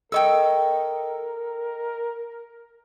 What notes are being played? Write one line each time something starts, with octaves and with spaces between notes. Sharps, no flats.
A4 A#4 D#5 G5 C#6 E6